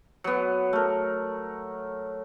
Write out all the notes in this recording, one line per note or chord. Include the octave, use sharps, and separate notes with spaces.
F#3 B3
A3 A#4